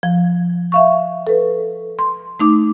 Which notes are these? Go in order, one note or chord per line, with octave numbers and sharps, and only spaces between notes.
F3
E5 F5 C#6
A4 B4
C6
A3 D#4 D6